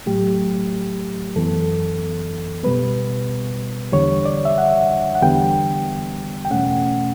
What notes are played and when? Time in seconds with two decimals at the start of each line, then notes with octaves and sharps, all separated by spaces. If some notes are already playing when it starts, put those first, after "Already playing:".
0.06 A2 F#3 A3 G4
1.36 F#2 E3 B3 A4
2.64 B2 G3 B3 B4
3.92 E2 D3 G3 C#5
4.25 D5
4.45 E5
4.58 F#5
5.15 F#5
5.22 E2 D3 G3 B3 G5
6.45 G5
6.50 E2 B2 A3 C#4 F#5